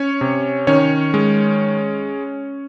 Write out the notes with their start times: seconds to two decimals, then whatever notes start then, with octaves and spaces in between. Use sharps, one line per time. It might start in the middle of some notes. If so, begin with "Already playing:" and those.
Already playing: C#4 C#5
0.21 C3
0.67 D#3 C#4 C#5
1.14 G#3